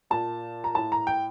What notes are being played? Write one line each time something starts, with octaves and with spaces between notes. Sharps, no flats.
A#2 A5
A#5
A2 A5
A#5
G5